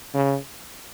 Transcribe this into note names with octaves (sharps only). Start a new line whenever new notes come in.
C#3